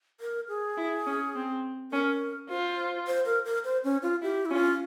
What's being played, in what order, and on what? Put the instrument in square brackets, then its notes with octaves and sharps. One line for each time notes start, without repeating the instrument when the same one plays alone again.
[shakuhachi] A#4
G#4
[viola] E4
C#4
C4
[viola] C#4 [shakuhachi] A#4
[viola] F4 [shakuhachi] C5
[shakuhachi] C5
A#4
A#4
C5
C#4
F4
[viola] E4 [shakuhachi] G4
[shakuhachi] E4
[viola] C#4 [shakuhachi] F4